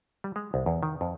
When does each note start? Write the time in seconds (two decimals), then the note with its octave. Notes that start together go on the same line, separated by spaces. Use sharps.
0.24 G3
0.36 G#3
0.54 C2
0.66 E2
0.83 D#3
1.01 F2